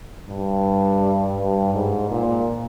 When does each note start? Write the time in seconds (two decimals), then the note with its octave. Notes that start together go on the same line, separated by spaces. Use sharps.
0.27 G2
1.37 G2
1.74 G#2
2.10 A#2